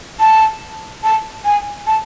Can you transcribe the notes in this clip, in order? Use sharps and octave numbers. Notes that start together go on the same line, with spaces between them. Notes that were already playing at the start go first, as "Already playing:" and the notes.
A5
A5
G#5
A5